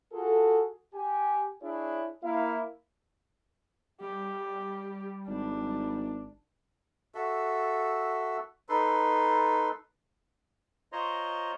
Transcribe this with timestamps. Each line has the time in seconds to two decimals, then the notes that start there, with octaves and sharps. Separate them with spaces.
0.12 F4 F#4 G#4 A4
0.93 G4 G#5
1.62 D4 E4 G#4 C#5
2.23 A#3 E4 F5
4.01 G3 G4
5.27 G#1 D4
7.15 F#4 A4 E5
8.69 D#4 A4 B4 C6
10.92 F4 C5 C#5 D#5 A#5 C6